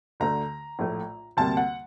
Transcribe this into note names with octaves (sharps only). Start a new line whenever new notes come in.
D2 D3 A3 A#5
A#1 A2 A3
D2 C3 G3 A#3 A5
F#5